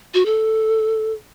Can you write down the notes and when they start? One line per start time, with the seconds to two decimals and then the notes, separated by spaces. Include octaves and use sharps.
0.14 F#4
0.26 A4